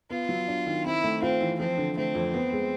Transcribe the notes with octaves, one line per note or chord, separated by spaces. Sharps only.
B3 F4
F#3
D4
D#3
C4 E4
A3
C4 F4
E3
F3 C4
D3
A3 C4
F2
B3
G#3